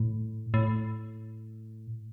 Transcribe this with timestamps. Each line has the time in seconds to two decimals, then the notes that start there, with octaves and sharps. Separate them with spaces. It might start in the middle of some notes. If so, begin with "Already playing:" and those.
Already playing: A2
0.54 A2